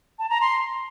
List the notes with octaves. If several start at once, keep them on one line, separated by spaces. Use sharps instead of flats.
A5
A#5
C6